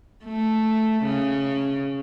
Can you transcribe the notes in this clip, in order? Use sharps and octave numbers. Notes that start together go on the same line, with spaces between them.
A3
C#3